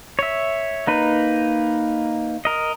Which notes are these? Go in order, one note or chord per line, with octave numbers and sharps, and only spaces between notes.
C#5 E5
A#3 D#4 B4
A#4 D#5